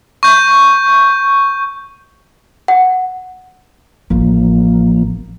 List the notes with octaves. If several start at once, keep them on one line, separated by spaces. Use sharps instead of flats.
C#6 G6
F#5
A1 F3 G#3 A#3